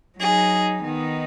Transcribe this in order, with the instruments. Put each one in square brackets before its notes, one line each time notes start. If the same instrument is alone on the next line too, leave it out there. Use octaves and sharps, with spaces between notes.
[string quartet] F#3 D#4 G#4
D#3 B3 D#4